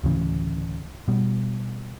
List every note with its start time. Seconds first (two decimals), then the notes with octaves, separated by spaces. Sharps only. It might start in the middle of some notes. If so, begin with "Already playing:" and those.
0.03 D2 A2 C#3 E3
1.08 B2 G3